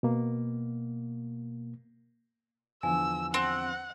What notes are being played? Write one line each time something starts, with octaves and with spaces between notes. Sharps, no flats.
B2 A#3
E2 D3 F3 G#5 E6
C4 F#5